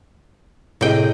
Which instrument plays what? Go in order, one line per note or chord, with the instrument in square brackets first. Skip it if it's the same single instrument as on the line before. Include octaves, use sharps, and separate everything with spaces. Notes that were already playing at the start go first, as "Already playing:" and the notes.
[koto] A2 G5 [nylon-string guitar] C3 G#4 D#5